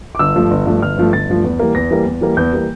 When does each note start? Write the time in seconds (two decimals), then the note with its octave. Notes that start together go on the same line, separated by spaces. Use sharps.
0.15 D6
0.19 G1 E6
0.35 G2 F3 A3
0.51 G1
0.66 G2 F3 A3
0.82 G1 F6
0.97 G2 F3 A3
1.13 G1 A6
1.29 G2 F3 A3
1.44 E2
1.59 E3 G3 A#3
1.75 E2 A#6
1.91 E3 G3 A#3
2.06 E2
2.21 E3 G3 A#3
2.37 E2 G6
2.52 E3 G3 A#3